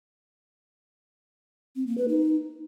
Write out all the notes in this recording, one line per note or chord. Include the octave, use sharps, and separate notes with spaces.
C4
A#3
B4
D#4